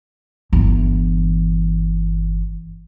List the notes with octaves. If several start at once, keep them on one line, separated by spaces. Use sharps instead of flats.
G1 E3